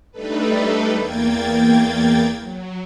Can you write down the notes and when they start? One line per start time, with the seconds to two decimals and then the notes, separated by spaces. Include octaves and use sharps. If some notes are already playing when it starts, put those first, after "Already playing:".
0.11 G3 A3 D4 D#4 A4 B4
0.93 E2 A#3 G5 G#6 A6
2.41 F#3